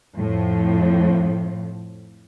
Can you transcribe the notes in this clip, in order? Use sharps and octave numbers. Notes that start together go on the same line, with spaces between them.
F2 A2 F3